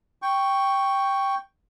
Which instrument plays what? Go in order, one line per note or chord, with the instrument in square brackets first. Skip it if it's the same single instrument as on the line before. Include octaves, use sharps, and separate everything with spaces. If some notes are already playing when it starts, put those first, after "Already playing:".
[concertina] G5 C#6